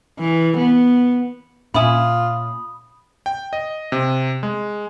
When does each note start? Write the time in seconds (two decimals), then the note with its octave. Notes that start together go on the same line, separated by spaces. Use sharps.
0.19 E3
0.57 B3
1.74 A#2 C#4 F4 E5 G#5 B5 D#6
3.26 G5
3.53 D#5
3.92 C3
4.43 G#3